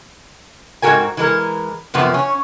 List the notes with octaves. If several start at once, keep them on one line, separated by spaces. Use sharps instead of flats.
G#2 C4 F#4 G4 A#4 G#5
E3 G#3 A#4
F#2 C3 F3 B3 A#4
C#4